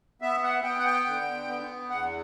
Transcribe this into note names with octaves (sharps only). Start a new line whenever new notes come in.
B3 E5
F#5
B3 G5
F#5
G5
D3
B3
E2 F#5